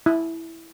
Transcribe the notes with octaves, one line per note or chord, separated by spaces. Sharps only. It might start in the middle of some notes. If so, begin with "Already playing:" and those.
E4